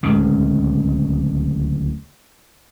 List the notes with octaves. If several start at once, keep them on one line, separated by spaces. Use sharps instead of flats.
D1 C#2 C#3